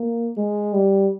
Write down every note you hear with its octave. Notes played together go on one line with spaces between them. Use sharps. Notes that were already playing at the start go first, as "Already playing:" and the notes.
Already playing: A#3
G#3
G3